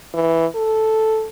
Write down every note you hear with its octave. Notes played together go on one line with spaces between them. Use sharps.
E3
A4